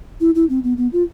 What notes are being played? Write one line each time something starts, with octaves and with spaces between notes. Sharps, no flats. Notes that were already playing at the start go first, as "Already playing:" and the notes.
E4
E4
C4
B3
B3
F4